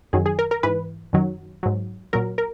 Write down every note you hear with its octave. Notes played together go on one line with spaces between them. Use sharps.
F#2 D#3 F#3 G#4
G#4
A#4
A#4
G#2 E3 B4
F#2 D#3 F#3
G#2 F#3
A#2 F#3 A#4
A#4